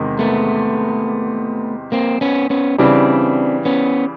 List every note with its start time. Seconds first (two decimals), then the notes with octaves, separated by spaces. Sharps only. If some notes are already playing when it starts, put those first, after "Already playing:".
Already playing: E2 C3 D#3 G#3
0.19 A3 B3
1.92 A#3 C4
2.21 B3 C#4
2.50 B3 C#4
2.78 C#3 E3 G3 C4 D4
3.65 B3 C#4